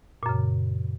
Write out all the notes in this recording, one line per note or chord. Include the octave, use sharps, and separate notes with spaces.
F#2 A#2 C#3